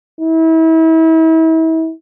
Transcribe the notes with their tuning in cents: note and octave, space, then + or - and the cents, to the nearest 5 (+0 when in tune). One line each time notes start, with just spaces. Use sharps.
E4 -35